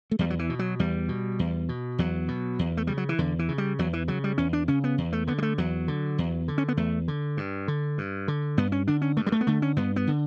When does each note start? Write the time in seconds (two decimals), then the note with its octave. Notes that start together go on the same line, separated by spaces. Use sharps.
0.11 A3
0.19 E2 G3
0.30 F#3
0.39 E3
0.49 B2
0.59 F#3
0.79 E2 G3
1.09 B2
1.39 E2
1.69 B2
1.98 E2 F#3
2.28 B2
2.59 E2
2.77 A3
2.87 C#3 G3
2.97 F#3
3.09 E3
3.18 E2 D3
3.39 E3
3.49 C#3
3.58 G3
3.79 E2 F#3
3.93 E3
4.08 C#3 F#3
4.24 G3
4.38 E2 C#4
4.53 D4
4.68 C#3 C#4
4.84 B3
4.98 E2
5.13 A3
5.27 D3 B3
5.38 G3
5.42 A3
5.58 E2 F#3
5.88 D3
6.18 E2
6.48 D3
6.58 C#4
6.68 B3
6.77 E2 A3
7.08 D3
7.37 G2
7.68 D3
7.98 G2
8.28 D3
8.57 G2 B3
8.72 C#4
8.88 D3 D4
9.02 C#4
9.17 G2 A3
9.26 G3
9.32 A3
9.41 B3
9.47 D3 A3
9.62 C#4
9.76 G2 B3
9.96 B3
10.07 D3